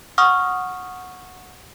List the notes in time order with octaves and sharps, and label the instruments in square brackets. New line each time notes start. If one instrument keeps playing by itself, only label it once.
[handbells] F#5 C#6 D#6 F6